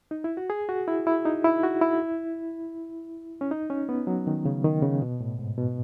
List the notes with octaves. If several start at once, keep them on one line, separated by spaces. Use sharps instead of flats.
D#4
E4
F#4
G#4
F#4
E4
E4
D#4
E4
F#4
E4
C#4
D#4
C#4
B3
F#3
D#3
C#3
D#3
C#3
B2
A2
G#2
B2